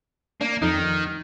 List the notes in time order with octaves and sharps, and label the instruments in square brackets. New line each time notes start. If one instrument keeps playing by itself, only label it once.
[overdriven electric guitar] A#3 [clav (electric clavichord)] D4
[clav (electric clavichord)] F2 D#4 [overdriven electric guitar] D#3